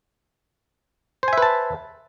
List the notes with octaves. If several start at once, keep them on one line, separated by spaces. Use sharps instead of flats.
B4 C5 E5 G#5 A5